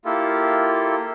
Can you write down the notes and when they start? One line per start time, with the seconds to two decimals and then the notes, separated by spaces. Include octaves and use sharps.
0.05 A#3 E4 F4 G4 A4